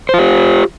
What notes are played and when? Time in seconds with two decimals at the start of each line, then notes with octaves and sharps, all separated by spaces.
0.09 C5
0.14 F4
0.19 G4